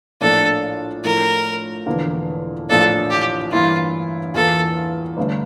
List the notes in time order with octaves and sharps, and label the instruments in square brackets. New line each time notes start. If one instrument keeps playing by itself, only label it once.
[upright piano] A#1 A2 F3 A#3 D4 [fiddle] A4
[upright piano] A2 F3 A3 E4 [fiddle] A#4
[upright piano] E1 E2 D3 F3 A#3
[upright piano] A#1 A2 F3 A#3 D4 [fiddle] A4
[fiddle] G4
[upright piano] G2 E3 A#3 E4 [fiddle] F4
[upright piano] E2 E3 A#3 F4 [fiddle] A4
[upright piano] G1 G2 D3 A3